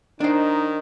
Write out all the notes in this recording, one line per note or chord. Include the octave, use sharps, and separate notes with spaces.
D#3 D4 D#4 C5